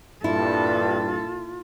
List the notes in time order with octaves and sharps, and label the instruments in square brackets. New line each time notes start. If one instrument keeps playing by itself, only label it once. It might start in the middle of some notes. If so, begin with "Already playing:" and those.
[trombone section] G2 [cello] A#2 A4 [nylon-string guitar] E4 [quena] F4